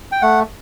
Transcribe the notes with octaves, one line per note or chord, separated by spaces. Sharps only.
G5
A3 F#5